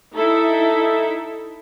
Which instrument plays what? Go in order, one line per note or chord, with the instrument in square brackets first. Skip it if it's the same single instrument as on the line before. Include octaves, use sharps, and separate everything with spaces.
[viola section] D#4 E4 A4 E5